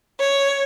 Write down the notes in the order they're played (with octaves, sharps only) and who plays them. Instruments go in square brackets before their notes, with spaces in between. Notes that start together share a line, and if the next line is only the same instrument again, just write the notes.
[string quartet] C#5